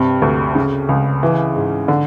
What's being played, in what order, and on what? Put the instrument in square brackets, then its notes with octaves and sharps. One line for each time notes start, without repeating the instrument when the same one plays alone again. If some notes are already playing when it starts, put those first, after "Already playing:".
Already playing: [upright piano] G2 C3
D2
C#3
C#2
E3
G#2
D3